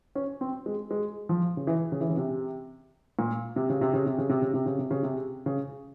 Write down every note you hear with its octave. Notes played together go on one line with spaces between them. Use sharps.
C#4
C4
G#3
G#3
F3
C#3
E3
C#3
E3
C#3
C3
A#2
C3
C#3
C3
C#3
C3
C#3
C3
C#3
C3
C#3
C3
C#3
C3
C#3